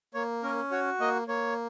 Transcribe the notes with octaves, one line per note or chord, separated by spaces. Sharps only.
A#3 C#5
C#4 A#4
F#4 C#5
A#3 D#5
A#3 C#5